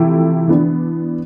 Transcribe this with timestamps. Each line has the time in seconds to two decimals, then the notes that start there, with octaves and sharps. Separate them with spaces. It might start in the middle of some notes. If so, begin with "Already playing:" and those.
Already playing: C3 E3 F3 A3 E4 G4
0.48 E3 B3 D4